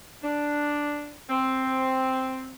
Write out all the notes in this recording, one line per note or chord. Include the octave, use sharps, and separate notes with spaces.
D4
C4